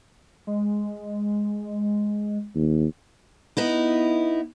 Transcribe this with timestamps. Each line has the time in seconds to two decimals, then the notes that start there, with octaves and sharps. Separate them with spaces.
0.47 G#3
2.55 D#2
3.57 B3 D#4 E4